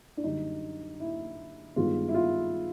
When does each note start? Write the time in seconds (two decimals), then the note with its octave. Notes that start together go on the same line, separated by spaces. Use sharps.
0.17 D4
0.24 F#2 D3 G3 D#4
1.00 E4
1.76 G2 D#3 G#3 B3 F4
2.09 E4
2.14 F4